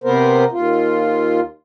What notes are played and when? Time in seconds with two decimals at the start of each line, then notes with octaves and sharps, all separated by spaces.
0.04 C3 B3 A#4 C5
0.52 D#2 F4